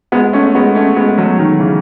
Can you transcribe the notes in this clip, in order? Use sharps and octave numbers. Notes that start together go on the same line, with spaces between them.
G#3 B3
A3 C#4
G#3 B3
A3 C#4
G#3 B3
F#3 A3
D#3 F#3
C#3 E3